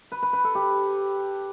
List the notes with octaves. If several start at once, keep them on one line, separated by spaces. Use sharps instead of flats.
B4
B4
B4
A4
G4